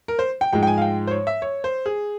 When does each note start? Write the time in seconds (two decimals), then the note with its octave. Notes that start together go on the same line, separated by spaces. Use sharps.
0.08 A#4
0.19 C5
0.41 G5
0.53 G#2 F3 G#3 G5
0.63 G5
0.67 G#5
0.78 F5
0.82 G5
1.07 C5
1.11 C#5
1.27 E5
1.42 C#5
1.64 C5
1.86 G#4